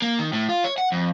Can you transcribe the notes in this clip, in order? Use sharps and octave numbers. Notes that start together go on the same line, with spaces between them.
A#3
D#3
A2
F4
C#5
F#5
F2